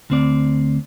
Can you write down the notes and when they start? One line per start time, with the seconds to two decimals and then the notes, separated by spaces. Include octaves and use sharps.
0.10 D2 C4 D5